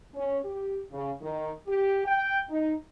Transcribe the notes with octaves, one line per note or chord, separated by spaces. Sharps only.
C#4
G4
C#3
D#3
G4
G5
D#4